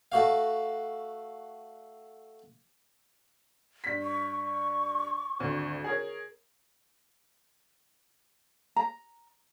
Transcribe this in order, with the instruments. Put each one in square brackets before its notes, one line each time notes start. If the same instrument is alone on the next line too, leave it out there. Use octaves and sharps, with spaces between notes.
[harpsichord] A3 F#4 F5
[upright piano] G2 B6
[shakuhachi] C#6
[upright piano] G#1 D2
G#4 A#4 C#5
[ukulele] A#5